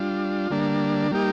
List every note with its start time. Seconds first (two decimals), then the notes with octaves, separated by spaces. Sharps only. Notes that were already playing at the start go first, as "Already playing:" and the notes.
Already playing: G3 D4 F4
0.50 D3 G3 A#3 D4
1.11 G3 A#3 D#4 G4